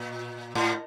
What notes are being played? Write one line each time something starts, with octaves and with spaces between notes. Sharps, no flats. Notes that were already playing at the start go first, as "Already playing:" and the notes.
Already playing: A#2
A2